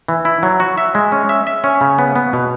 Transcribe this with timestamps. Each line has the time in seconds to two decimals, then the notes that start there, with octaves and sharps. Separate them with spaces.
0.08 E3
0.25 E4
0.43 F#3
0.60 F#4
0.78 E5
0.95 G#3
1.12 C#4
1.29 E5
1.47 E5
1.64 C#4
1.81 C#3
1.98 B3
2.16 B3
2.33 B2